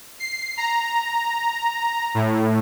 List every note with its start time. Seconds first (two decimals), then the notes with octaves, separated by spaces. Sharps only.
0.19 C7
0.57 A#5
2.14 A2